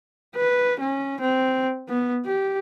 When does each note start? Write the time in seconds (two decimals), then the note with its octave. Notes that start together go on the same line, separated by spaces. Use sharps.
0.36 B4
0.80 C#4
1.21 C4
1.89 B3
2.25 G4